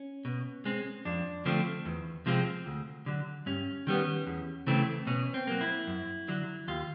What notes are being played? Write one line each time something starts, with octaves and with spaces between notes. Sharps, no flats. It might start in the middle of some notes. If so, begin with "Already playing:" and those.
Already playing: C#4
B2
G#3 C4
F2 D4
D3 F3 A3 C4
E2
C3 F3 G#3 C4
D2
D3 F#3
G2 C#4
D#3 G3 B3
E2
C#3 E3 A3 C4
B2 C#4
C4
F#3 A#3
E4
F#2
D3 F#3
D#2 F4